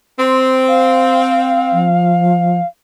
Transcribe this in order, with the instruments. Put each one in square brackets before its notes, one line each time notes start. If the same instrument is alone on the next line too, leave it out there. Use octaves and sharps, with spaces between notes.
[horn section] C4 [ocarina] C6
[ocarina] F5
[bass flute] F3